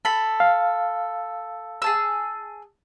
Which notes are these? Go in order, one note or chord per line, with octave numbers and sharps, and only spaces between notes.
A4 B5
F5
G#4 A5 E6